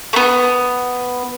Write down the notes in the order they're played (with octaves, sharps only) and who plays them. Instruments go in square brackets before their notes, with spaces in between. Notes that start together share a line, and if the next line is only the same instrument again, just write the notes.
[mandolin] A3 B3